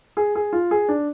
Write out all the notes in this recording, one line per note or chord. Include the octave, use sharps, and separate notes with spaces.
G#4
G#4
F4
G#4
D4